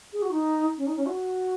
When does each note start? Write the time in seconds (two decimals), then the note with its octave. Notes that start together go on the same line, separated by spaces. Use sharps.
0.12 G#4
0.22 F#4
0.31 D#4
0.77 C#4
0.87 D#4
0.96 C#4
1.06 F#4